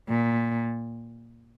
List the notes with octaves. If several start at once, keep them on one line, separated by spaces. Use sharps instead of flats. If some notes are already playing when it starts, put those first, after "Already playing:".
A#2